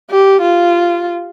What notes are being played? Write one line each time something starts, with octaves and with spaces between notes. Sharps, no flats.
G4
F4